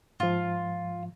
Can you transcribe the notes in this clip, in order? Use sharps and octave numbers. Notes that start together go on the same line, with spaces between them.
G#2 F3 F4